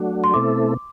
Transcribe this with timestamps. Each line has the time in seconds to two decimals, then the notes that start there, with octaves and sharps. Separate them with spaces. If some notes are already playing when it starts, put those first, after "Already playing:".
Already playing: F#3 A3 D4 F#4
0.24 C6
0.33 B2 A3 C4 E4 A4 D6